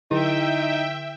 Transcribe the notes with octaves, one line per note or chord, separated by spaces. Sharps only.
D3 D#4 E4 E5 G5